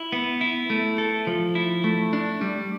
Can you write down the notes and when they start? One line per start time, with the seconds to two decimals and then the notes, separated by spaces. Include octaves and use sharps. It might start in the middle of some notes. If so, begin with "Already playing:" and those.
Already playing: E4
0.12 B3
0.41 E4
0.70 A3
0.98 A4
1.27 F3
1.55 E4
1.84 A3
2.13 D4
2.41 G3